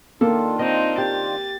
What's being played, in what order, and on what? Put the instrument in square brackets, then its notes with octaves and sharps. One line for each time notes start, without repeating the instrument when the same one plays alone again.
[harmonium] D#3 D4 F4 [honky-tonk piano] A#3 [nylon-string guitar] A4
[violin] C4 D#4 [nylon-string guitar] D#5
[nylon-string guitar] G4 [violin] A6